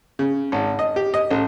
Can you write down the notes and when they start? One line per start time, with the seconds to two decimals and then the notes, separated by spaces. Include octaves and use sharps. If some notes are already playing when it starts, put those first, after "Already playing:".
0.19 C#3
0.52 G#1
0.79 D#5
0.96 G4
1.14 D#5
1.31 A1